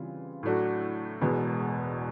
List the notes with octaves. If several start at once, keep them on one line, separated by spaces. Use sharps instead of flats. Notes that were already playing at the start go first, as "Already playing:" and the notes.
Already playing: C#3 E3 G3 C4 F4
A2 F#3 A3 D4 F#4
E1 E2 B2 G#3 B3